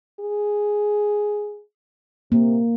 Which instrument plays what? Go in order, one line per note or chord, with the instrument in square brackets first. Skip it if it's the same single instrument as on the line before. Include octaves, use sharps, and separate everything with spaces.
[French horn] G#4
[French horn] C3 [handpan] A#3